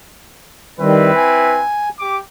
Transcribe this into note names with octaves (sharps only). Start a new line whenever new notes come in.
D#3 G3 C4 E4 B4
G#5
G4 D6